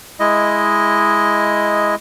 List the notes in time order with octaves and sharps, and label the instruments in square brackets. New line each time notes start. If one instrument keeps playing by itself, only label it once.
[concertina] G#3 E4 D#5